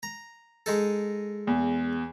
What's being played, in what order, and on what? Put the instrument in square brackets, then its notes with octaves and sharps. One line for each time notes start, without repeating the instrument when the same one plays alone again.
[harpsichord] A#5
G#3 D#4 A4
[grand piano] E2